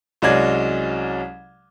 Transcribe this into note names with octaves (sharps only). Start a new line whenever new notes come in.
C2 F#3 G#3 C#4 D5 G#6